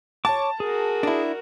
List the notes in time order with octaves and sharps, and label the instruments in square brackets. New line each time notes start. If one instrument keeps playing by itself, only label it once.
[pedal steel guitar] C#5 D6 [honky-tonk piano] A5
[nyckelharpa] F#4 A#4 [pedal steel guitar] G#4
[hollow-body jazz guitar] D4 E4